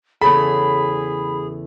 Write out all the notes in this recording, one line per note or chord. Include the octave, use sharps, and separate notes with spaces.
E2 C#3 G#4 A4 B5